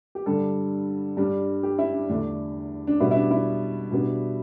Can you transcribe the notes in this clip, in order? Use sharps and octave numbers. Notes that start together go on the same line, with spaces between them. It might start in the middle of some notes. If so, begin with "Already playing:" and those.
G4
G2 D3 G3 D4 A4
G2 G3 D4
G4
E4
D4
E2 D3 A3 D4
D4
B2 G3 B3 E4
E4
D4
E4
B2 G3 B3 D4